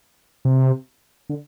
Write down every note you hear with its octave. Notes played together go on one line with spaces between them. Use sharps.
C3
D3